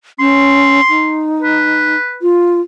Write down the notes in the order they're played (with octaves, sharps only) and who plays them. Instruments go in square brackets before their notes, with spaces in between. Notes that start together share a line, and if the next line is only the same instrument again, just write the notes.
[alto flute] C#4 [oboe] C6
[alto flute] D#4
[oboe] B4
[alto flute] F4